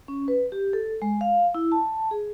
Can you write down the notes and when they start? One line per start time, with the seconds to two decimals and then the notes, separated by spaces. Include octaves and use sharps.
0.08 C#4
0.28 B4
0.52 G4
0.73 A4
1.02 G#3
1.21 F5
1.55 E4
1.72 A5
2.11 G#4